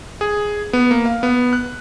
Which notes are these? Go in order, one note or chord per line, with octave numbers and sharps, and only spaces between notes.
G#4
B3
A#3
F5
B3
F#6